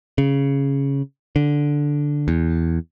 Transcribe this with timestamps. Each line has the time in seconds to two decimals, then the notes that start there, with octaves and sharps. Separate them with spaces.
0.18 C#3
1.36 D3
2.28 E2